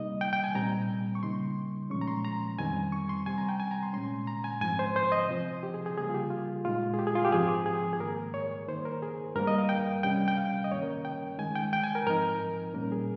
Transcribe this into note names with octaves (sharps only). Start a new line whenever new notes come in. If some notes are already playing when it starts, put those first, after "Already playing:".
Already playing: C3 G3 A#3 D#4 D#5
G5
G5
G#5
A#2 G3 C4 A#5
C#6
C#3 G3 A#3 D#4 C6
A#2 F3 G#3 C#4 C#6
A#5
C6
A#5
F2 D#3 G3 C4 G#5
C#6
C6
C3 G3 C4 G#5
A#5
G5
G#5
A#5
C6
A#2 G#3 C#4 C6
A#5
G#5
G#2 F3 C4 G#5
C5
C5
D#5
C3 F3 C4
G4
G#4
G#4
C#3 G3 A#3 G#4
F4
G4
F4
A#2 G#3 D#4 F4
G#4
G4
G#4
F4
G4
G#2 F3 C4 G#4
G#4
G#4
G#2 D#3 A#3 A#4
C#5
G2 D#3 A#3 D#4 C5
A#4
G#4
G2 G3 A#3 A#4
D#5
F5
G5
C3 G3 C#4 G5
G5
F5
D#5
G2 D#3 A#3 C#4 C#5
A#4
G5
D#3 G#3 D#4 G#5
G5
G5
G#5
A#4
G#2 F3 C4 D#4 A#4
A#2 G3 A#3 C#4 A#4
G#4